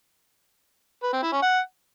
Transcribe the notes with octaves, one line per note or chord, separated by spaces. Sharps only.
B4
C4
E4
C#4
F#5